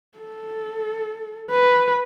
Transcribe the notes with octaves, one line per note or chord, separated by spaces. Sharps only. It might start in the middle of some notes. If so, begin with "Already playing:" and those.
A4
B4